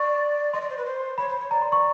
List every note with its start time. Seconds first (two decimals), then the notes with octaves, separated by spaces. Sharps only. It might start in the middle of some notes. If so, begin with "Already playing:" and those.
Already playing: D5 C#6
0.54 D#5 C6
0.62 D5
0.70 C5
0.77 B4
0.85 C5
1.18 C#5 B5
1.29 C5
1.40 C#5
1.50 D5 A#5
1.62 C6
1.72 C#6